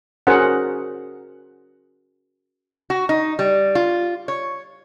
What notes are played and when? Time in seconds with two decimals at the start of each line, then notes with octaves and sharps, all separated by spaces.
0.27 C#4 F#4 G#4 A#4 C5 F#5
2.90 F#4
3.09 D#4
3.39 G3
3.75 F4
4.28 C#5